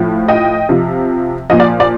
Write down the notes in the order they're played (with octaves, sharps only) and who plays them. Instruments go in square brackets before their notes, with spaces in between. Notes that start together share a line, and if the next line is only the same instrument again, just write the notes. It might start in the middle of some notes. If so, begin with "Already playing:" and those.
Already playing: [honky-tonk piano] A2 F3
D#5 G5
C3 F3
A#2 F3 D#5
D5
D5